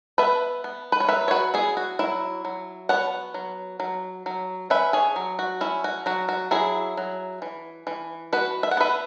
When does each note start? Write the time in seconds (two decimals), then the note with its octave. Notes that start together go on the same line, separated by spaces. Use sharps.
0.18 B3 B4 E5
0.64 B3
0.92 B4
1.00 C#5
1.08 F#3 B4 E5
1.28 C#5
1.31 F#4 B4
1.54 B3 E4 G#4
1.77 F#4
1.99 F#3 E4
2.45 F#3
2.89 B3 C#5 F#5
3.34 F#3
3.80 F#3
4.26 F#3
4.70 C#4 B4 E5
4.93 G#4 C#5
5.16 F#3
5.39 F#4
5.61 C#4 E4
5.84 F#4
6.06 F#3 F#4
6.29 F#4
6.51 F#3 E4 G#4
6.97 F#3
7.42 E3
7.87 E3
8.33 B3 F#4 B4
8.63 E5
8.71 F#5
8.77 B3 B4 E5